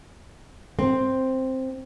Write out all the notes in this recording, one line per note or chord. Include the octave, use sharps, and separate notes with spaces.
C4